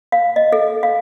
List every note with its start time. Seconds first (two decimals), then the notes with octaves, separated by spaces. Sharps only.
0.12 F5
0.36 D#5
0.52 A4
0.83 F5